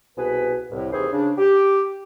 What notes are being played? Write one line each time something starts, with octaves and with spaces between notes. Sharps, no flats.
C2 B2 G#4 B4
C2 A2
D#2 C3 E3 G#4 C5
C#3 D4
G4